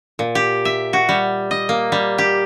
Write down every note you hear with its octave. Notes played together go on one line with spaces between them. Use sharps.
A#2
G4
E5
F#4
G3
D#5
A#3
G3
G4